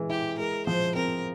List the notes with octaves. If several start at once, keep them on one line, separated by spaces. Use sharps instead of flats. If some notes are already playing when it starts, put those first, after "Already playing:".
Already playing: E3 G#3
E4 G4
G#3 A#4
F3 C5
C4 A#4